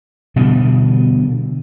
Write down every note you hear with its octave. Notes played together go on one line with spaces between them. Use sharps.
B2 D3 E3 G3